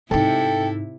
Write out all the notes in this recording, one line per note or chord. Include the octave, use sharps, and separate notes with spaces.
G#2 C3 D#4 E4 A4 G5